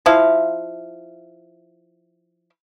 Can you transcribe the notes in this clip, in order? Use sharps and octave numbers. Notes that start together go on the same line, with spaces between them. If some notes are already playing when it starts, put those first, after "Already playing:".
F3 E4 F5